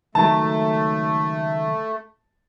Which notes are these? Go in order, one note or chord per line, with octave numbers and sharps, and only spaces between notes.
C#2 D#3 F#3 A3 A5